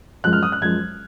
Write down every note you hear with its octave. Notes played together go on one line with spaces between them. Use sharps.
F#2 F3 G#3 F#6
F6
D#6
F#6
F#2 F3 G#3 G#6